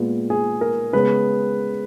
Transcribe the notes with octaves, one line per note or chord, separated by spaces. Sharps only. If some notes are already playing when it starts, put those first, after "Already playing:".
Already playing: A#2 G#3 B3
G#4
A#4
C#3 G#3 B3 B4